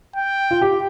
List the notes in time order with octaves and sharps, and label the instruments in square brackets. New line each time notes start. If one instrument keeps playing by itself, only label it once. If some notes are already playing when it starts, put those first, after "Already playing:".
[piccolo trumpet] G5
[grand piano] F4
G4